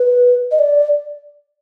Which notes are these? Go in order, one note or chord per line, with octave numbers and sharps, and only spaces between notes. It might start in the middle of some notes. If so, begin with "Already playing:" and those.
Already playing: B4
D#5
D5